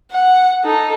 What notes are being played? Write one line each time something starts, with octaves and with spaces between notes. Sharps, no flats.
F#5
D#4 A4